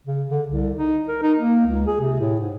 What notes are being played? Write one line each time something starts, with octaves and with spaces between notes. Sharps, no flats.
C#3
D3
C2
D#4
A#4
D#4
A#3
C#2
G#4
C3
A2
G#2